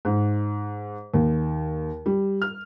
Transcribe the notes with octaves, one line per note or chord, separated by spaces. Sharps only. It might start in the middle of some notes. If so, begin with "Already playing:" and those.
G#2
D#2
G3
F6